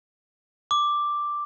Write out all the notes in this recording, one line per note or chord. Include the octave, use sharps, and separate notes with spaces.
D6